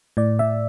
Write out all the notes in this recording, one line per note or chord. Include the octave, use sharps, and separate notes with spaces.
A2 D5
A2 E5